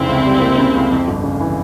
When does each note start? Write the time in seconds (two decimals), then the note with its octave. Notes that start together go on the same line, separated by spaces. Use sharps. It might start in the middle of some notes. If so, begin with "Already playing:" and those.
Already playing: F1 C#3 C4 E4
0.09 C#2
0.26 G3
0.41 A#3
0.58 C#3
0.75 C#2
0.91 F2
1.08 G1
1.23 C#3
1.40 E3